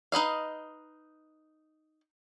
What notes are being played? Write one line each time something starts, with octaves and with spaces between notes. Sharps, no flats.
D#4 B4 D#5 F5